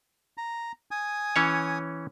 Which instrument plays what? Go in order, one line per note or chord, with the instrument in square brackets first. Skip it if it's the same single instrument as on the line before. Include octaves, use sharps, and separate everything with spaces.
[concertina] A#5
G#5 D#6
[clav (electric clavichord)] E3 C#4 C#5